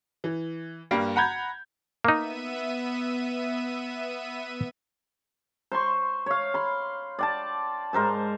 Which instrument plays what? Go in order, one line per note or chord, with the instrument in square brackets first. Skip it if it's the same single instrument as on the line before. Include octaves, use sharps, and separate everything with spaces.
[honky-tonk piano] E3
G2 G3 A#3
F#5 A#5 B5 G6 G#6
[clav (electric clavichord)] A#3 D#4 [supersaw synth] B3 E5 D#7
[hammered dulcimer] C5 C6 C#6
C#5 F5
B5 C6
D5 G5 A5
G#2 A#4 C5 A5